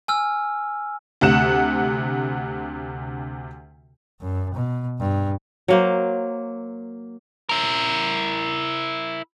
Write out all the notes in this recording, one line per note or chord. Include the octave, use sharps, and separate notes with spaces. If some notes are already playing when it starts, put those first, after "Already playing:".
G#5 E6 F6
D2 C3 F#5 E7
F#2
B2
G2
F#3 A#3 C5
E4 A#4